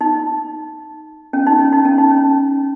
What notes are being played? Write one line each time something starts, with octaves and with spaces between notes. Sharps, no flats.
D#4
C#4
D#4
C#4
D#4
C#4
D#4
C#4